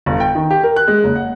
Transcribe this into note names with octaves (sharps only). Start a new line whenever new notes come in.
G1
G5
D#3
G4
A#4
F#6
G#3
F#1
F#5